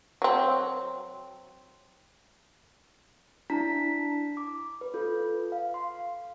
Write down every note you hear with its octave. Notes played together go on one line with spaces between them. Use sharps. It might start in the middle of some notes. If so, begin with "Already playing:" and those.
F#3 C4
D4 E4 A5 A#5 B6
D6
B4
F4 A4
F5
C6